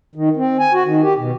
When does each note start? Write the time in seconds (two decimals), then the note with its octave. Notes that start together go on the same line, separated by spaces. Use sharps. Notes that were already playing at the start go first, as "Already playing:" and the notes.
0.15 D#3
0.36 C4
0.59 G#5
0.73 F#4
0.86 D#3
1.03 G4
1.18 B2